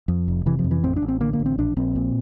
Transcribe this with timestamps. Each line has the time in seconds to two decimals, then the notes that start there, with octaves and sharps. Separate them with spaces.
0.08 F2
0.28 F1
0.46 C3 E3
0.59 F3
0.64 F2
0.71 E3
0.83 A1 C4
0.96 D4
1.02 A1
1.08 C4
1.21 D3 A#3
1.33 A#3
1.40 A1
1.46 C4
1.58 A#1 D4
1.77 A#1 C4
1.96 A#2